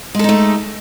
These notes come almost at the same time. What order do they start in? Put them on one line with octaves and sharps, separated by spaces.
G#3 A4 D#4 A3